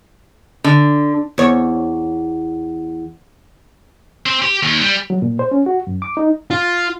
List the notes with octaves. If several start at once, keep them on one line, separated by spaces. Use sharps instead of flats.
D3
E2 C#5
C4
G4
D#2
G3
F#3
A#2
C5
C#4
F#4
F#2
D6
D#4
F4